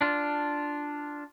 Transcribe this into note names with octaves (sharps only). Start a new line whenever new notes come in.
D4 F4